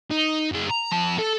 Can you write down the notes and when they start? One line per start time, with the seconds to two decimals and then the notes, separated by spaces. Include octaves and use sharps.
0.11 D#4
0.52 F#2 G#4
0.70 A#5
0.92 F2 A5
1.19 A4